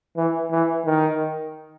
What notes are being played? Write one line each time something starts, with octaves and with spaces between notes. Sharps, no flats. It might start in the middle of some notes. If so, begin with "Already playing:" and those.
E3
E3
D#3